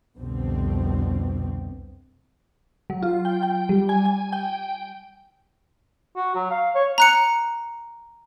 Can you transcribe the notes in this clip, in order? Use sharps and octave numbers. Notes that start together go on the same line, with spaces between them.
C2 F2 B2 D3 C4
F#3
F4
G5
G5
G3
G#5
G#5
G5
F#4
F#3
F5
C#5
A#5 F#6 C#7